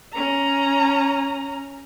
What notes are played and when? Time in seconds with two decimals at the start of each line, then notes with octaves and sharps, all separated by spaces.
0.14 C#4 A#5